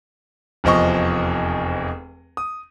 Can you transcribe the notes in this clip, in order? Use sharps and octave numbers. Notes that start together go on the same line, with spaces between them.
F1 E2 F3 D#5 C#6
D#6